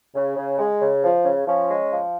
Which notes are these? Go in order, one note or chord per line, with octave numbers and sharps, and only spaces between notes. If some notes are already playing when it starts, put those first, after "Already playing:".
C#3
C#3
G#3
C#3
F3
C#3
F3 C#4
G#3
F3